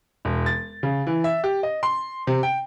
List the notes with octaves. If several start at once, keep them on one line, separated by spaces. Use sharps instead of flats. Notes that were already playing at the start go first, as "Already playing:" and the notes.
E1
A6
C#3
E3
E5
G4
D#5
C6
C3
G5